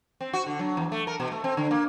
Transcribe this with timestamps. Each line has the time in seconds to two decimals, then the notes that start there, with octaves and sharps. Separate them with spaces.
0.21 C4
0.33 F#4
0.46 D3
0.59 F#3
0.77 E2
0.92 A3
1.07 A#4
1.20 B2
1.32 A3
1.44 C4
1.57 D3
1.71 A#3